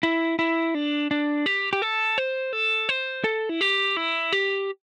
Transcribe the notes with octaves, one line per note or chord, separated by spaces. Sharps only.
E4
E4
D4
D4
G4
G4
A4
C5
A4
C5
A4
E4
G4
E4
G4